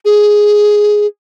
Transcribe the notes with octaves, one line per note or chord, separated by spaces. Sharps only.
G#4